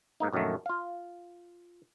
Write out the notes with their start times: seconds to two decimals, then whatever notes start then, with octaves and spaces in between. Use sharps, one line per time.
0.20 G#2 A#3 D#4
0.32 A#1 F#2 D#3 F#3 A3
0.66 F4 F5